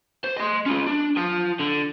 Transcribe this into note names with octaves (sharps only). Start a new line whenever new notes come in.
C5
D#5 C6
C#4 F4
D4
F4 A5
D3